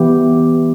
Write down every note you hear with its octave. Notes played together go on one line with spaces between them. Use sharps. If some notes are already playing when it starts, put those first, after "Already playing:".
Already playing: E3 B3 E4 G4